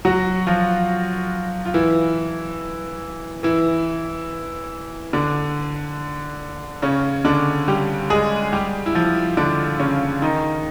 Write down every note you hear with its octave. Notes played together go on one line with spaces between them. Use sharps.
F#3 F#4
F3 F4
F4
E3 E4
E3 E4
D3 D4
C#3 C#4
D3 D4
G3 G4
G#3 G#4
G3 G4
E4
F3 F4
D3 D4
C#3 C#4
D#3 D#4